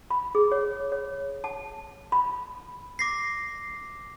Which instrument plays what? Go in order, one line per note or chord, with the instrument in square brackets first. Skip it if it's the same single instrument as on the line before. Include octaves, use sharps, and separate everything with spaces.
[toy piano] B5
G#4
C#5
C#5
A5
B5
[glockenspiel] D6 A#6 C7